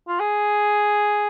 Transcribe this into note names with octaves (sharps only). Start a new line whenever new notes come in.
F4
G#4